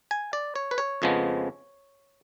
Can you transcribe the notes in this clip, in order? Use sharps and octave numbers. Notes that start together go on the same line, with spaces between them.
G#5
D5
C#5
B4
C#5
F2 C#3 F3 G#3 B3